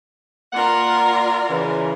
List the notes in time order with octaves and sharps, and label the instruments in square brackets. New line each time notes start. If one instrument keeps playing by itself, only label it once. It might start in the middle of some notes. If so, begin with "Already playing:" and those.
[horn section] A#3 F#5 [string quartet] F4 A#4 D5
[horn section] C#3 E3